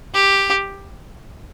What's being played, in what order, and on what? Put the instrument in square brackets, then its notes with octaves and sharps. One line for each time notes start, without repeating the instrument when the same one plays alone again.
[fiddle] G4